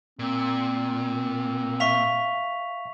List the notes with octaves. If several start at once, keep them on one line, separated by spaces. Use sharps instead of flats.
A#2 C4
E5 F5 C#6 B6 F7